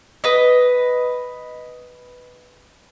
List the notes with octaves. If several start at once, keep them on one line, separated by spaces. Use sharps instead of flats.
B4 D#5